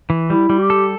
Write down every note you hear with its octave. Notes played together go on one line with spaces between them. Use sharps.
E3
G3 E4
G3
G4
A4